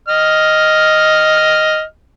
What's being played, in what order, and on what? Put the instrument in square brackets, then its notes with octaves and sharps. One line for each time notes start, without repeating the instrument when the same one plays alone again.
[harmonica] D#5 F6